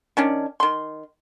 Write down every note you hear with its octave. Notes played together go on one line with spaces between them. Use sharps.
D#3 C#4 D4
D#3 C6